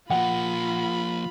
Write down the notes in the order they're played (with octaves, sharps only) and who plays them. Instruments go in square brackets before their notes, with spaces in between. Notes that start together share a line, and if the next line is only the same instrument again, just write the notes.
[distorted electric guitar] F3 A#3 [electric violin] F4 B5 [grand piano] F#5